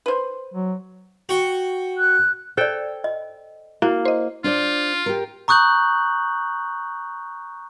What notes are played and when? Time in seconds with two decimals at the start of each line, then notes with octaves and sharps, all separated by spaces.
0.06 B4 C5
0.54 F#3
1.29 F#4 G5 C#6
1.98 F#6
2.57 A4 C5 D5 G5
3.04 D#5
3.82 A#3 E4 F#4
4.05 C5 D#5
4.44 D4 F4 C5 D5
5.06 G4 A#4
5.48 A#5 C#6 D#6 F#6 G6 F#7